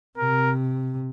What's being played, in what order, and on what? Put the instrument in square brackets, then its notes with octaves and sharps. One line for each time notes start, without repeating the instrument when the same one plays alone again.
[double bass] C3 [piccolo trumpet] A#4